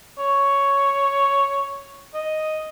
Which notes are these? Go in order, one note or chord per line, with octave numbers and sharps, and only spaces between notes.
C#5
D#5